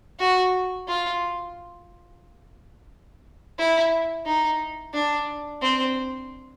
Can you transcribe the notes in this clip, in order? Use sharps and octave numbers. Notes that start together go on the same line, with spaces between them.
F#4
F4
E4
D#4
D4
C4